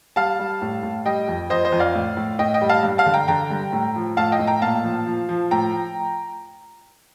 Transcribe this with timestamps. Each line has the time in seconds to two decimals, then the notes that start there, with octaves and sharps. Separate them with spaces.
0.16 G3 F5 A5
0.39 G3
0.62 A2
0.83 A2
1.06 G3 D#5 G5
1.28 F2
1.50 F2 C5 D#5
1.65 C5 D#5
1.72 F2
1.79 D5 F5
1.94 A2
2.17 A2
2.39 A2 D#5 G5
2.54 D#5 G5
2.61 G3
2.69 F5 A5
2.83 G2
2.98 F5 A5
3.06 D3
3.14 G5 A#5
3.28 D3 G5 A#5
3.50 G2
3.72 A2
3.96 F3
4.17 A2 F5 A5
4.32 D#5 G5
4.39 A2
4.47 G5 A#5
4.62 A#2 F5 A5
4.84 F3
5.06 F3
5.29 F3
5.51 A2 G5 A#5